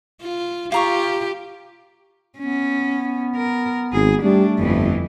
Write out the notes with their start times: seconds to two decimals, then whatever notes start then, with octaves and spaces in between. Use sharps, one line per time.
0.21 F4
0.72 F4 G4 F5 A#5 C#6
2.38 B3 C#4
3.36 A#4
3.93 G#1 G#4
4.23 G3 A3 D4
4.59 G1 F2 E3